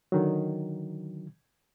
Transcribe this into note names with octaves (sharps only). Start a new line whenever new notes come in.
D3 D#3 F#3